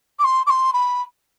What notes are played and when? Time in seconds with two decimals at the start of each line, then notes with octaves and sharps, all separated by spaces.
0.19 D6
0.24 C6
0.46 D6
0.50 C6
0.73 B5